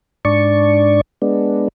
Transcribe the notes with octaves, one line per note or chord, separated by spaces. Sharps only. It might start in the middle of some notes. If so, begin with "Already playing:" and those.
G#2 D4 D5 C#6
G#3 B3 D4